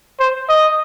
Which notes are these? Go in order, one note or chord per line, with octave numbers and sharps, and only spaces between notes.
C5
D#5